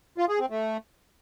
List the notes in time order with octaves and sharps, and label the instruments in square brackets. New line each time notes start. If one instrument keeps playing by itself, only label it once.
[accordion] F4
G#4
C4
A3